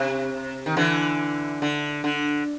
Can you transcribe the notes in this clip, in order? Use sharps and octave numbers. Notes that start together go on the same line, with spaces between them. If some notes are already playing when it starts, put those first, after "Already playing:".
Already playing: C3
D#3
D3 E3
D3
D3